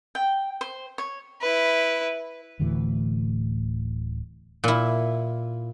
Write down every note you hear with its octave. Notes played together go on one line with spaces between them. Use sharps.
G5
C5
C#5
E4 B4
D1 D2 A2 E3
A#2 E4